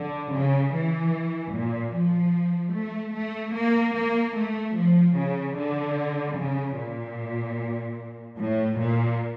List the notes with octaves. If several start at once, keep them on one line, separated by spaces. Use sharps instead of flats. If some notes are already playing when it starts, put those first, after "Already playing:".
Already playing: D3
C#3
E3
A#2
F3
A3
A3
A#3
A#3
A3
F3
C#3
D3
C#3
A#2
A2
A#2